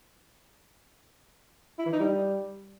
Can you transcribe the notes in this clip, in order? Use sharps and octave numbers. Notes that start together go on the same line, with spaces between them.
E4
E3
D#4
G3